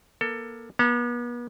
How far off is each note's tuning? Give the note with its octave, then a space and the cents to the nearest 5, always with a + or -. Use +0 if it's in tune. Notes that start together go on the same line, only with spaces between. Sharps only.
A#3 +30 A4 +25
B3 -40 A5 +40